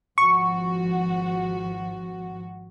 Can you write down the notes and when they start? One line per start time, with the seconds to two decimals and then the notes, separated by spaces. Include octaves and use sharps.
0.18 G#1 F3 F#4 C#6